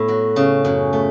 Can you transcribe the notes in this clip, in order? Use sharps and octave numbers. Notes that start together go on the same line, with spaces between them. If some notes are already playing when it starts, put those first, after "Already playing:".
Already playing: A2 B3
F#3
C#3
F#2
A3